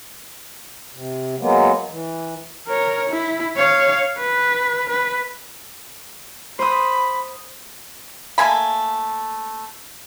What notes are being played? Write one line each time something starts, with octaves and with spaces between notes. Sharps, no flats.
C3
F#3 G#3 A#3 B3
E3
A#4 C#5
E4
C#5 F5
B4
B4
C5 B5 D#6
A3 A#3 G#5 B5